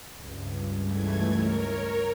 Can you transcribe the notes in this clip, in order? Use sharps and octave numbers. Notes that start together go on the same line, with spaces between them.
C#2 G2
E3 A3 G#6
A#4 C#5